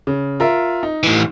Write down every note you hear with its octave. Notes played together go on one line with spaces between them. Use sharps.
C#3
F4 A#4 E5
D#4
A2 E3